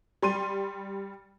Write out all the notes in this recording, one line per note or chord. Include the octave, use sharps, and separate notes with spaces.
G3 C6 D#7